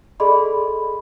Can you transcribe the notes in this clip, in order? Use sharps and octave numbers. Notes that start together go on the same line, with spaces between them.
G#4 A4 D5 D#5 B5 C6